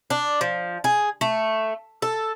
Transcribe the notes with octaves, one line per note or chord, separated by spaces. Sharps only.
D4
F3
G#4
A3
A4